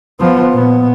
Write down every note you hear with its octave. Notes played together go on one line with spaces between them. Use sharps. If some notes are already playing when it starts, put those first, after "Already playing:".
F3 B3
A#2 B3